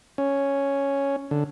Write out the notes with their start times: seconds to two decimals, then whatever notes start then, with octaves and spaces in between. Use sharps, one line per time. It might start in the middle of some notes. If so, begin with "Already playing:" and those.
0.18 C#4
1.31 D3